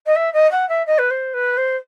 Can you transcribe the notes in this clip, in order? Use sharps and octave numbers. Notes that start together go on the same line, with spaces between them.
D#5
E5
D#5
F#5
E5
D#5
B4
C5
B4
C5